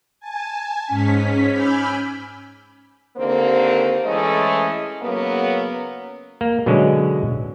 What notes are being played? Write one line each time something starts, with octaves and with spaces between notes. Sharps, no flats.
G#5 A5
G#2 C#4 B6
G#5 B5 D6 E6 F6 G6
D#2 D3 A#3 C4 C5
E3 G#3 A3 C#4 A4 D#5
C#3 F#3 A#3 B3
A#3
B2 D3 F#3 G#3 C#4